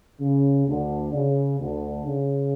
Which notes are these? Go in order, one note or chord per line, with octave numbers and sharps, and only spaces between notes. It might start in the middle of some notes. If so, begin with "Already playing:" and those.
C#3
D2 D3
C#3
D2 D3
C#3